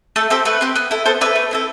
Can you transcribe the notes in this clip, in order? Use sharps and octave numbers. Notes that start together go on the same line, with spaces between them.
A3 A4
C4 G4 A4
A3 B4
C4 G4
B3
E4 A4
B3 A4 C5
E4 A4 B4 D5
A3
C4 E4 A4